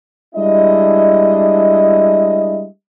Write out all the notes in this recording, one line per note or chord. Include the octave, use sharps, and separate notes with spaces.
G3 G#3 D4 E4 D#5